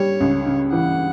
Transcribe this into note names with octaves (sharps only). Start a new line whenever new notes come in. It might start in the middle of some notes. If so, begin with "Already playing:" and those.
Already playing: G3 C#5
C#2
C#3
E3 F#5